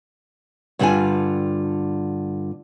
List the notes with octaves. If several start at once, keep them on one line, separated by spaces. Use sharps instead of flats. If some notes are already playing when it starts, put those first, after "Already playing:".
G2 D3 G3 D4 F4 G#5